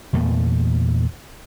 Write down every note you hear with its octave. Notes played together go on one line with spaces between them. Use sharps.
E2 A#2 A3 B3